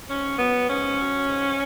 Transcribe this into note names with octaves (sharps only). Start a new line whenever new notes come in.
G#2 C#4
F#3 B3
G#2 C#4
F#3
G#2